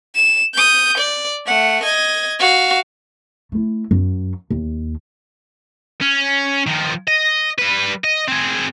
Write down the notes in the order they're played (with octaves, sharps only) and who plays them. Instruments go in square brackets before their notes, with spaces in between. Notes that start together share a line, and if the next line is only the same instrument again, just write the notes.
[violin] E7
D#6 G6
D5
A3 F#5
D#5 G#6
F#4 F5
[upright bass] A3 E4
F#2 F#3
D#2
[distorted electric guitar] C#4
D#3 F3
D#5
G3 B4
D#5
C4 G#4